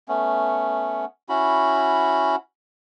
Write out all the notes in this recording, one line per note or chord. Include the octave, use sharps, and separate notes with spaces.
A3 B3 C#4
C#4 E4 F#4 B5